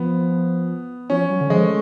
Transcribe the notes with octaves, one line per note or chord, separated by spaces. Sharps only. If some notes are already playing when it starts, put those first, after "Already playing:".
Already playing: F3 B3
F3 C#4
F#3
D3
F3 G#3
A3